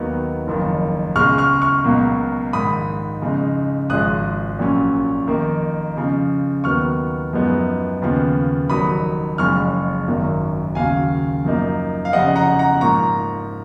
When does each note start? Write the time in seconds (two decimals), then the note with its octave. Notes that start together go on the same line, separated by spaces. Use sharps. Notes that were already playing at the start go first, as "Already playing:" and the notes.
Already playing: D#2 D#3 F#3 B3 D#4
0.47 F#1 F2 D#3
1.16 C#2 C#3 G#3 C#6 F6
1.38 C#6 F6
1.62 C#6 F6
1.84 C#2 B2 F#3 A#3
2.53 A#1 G#2 D#3 B5 D#6
3.21 F2 C#3 G#3 D#4
3.90 G#1 G#2 F3 G#3 D#6 F#6
4.59 A#1 A#2 F#3 C#4
5.27 F2 D#3 A#3 D#4
5.96 F2 C#3 F3
6.64 D#2 D#3 F#3 B3 C#6 F6
7.33 F#2 F3 G#3 B3 D#4
8.02 D#2 C#3 F3 B3
8.70 F1 F2 D#3 F#3 B5 D#6
9.38 F#1 F2 C#3 G#3 C#4 C#6 F6
10.08 G#1 F#2 D#3 F#3
10.75 D#2 C#3 F#3 F5 G#5
11.45 F#2 F3 A#3 D#4
12.05 F5
12.13 F1 F2 C#3 D#5 F#5
12.36 F#5 A#5
12.59 F#5 A#5
12.81 G#2 F3 A#3 A#5 C#6